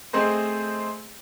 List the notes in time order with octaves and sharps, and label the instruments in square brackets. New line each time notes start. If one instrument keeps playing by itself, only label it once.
[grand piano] A3 C4 G#4 C5 D#5